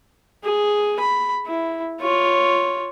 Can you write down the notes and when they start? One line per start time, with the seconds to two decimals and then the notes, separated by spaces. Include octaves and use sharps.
0.44 G#4
1.00 B5
1.47 E4
2.01 F4 C#5